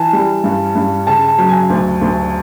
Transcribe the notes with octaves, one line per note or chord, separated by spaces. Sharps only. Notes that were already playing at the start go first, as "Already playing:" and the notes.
Already playing: E3 A5
G3
G2
G2
C#3 A5
A5
F#3
G#5
D2
D2